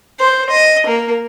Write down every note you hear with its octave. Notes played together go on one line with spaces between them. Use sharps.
C5
D#5
A#3